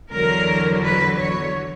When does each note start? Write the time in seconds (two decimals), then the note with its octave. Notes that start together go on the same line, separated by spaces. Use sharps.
0.13 E2 D3 F#3 A#4
0.84 B4
1.19 C#5